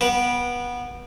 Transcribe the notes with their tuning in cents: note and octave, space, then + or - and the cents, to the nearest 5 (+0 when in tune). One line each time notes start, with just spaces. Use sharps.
B3 -20 B4 -25 G5 +0